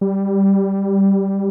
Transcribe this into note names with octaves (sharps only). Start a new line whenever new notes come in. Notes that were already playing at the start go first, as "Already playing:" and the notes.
G3